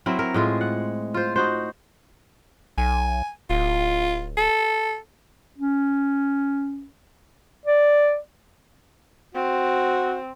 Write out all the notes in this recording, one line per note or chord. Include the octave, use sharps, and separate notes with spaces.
F#3 C4 E4 A#4
A#4
A2 G#3 F4 G#4
F#5
F4 C5
D#4 F#4 C5
B1 G#5
D1 F4
A4
C#4
D5
C4 F#4